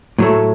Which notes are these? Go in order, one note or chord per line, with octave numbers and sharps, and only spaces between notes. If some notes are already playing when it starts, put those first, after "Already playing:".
A2 F#3 A3